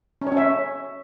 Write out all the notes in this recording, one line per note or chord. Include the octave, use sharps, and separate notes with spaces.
C#4
C#5
C#4
E5